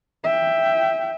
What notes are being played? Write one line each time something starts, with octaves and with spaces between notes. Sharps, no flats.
E5 G5